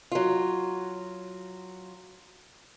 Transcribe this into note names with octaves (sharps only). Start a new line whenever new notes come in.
F#3 F4